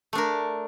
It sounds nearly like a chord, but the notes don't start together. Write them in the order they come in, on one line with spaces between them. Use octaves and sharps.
A3 D4 A#4